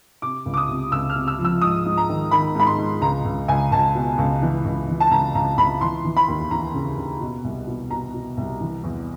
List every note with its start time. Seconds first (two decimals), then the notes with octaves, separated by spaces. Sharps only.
0.22 C3 D6
0.46 C#2
0.54 D6
0.57 D#6
0.69 C3
0.92 C#2 E6
1.10 F6
1.16 C3
1.28 E6
1.39 F3
1.45 E6
1.62 G#2 D#6
1.86 G#2
1.97 A#5
2.09 D#3
2.31 D#3 B5
2.55 G#2 B5
2.67 C6
2.78 G#2
3.02 C#2 A#5
3.25 C#2
3.48 C#2 G#5
3.72 C#2 A5
3.95 B2
4.18 C#2
4.42 E3
4.65 C#2
4.88 E3
5.00 A5
5.11 C#2 A#5
5.35 C#2 A#5
5.58 C#2 B5
5.81 E3 C6
6.05 E3
6.17 B5
6.28 D#2
6.51 E3 A#5
6.74 C#3
6.98 C#3
7.21 B2
7.44 C2
7.67 B2
7.91 B2 A#5
8.14 B2
8.37 C2
8.61 E3
8.84 E2